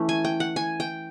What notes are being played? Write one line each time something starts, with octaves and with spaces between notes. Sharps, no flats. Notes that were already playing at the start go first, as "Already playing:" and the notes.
Already playing: E3 A3 C#4
G#5
G5
F#5
G#5
G5